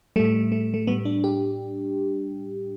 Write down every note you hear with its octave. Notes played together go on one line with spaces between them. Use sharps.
A2 G3 A3
A3
A3
A2 G3 B3
D4
G4